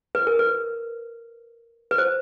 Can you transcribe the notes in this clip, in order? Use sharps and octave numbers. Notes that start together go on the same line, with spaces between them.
B4
A#4
B4
B4
C5